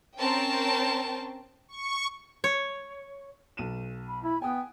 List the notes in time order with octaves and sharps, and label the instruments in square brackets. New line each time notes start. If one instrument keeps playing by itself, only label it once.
[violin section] C4 C#4 A#4 G5 A5
[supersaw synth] C#6
[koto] C#5
[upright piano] B1 D#7 E7
[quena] B5
[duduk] E4 [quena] B5
[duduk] B3 [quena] G5 [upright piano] G#5 D#6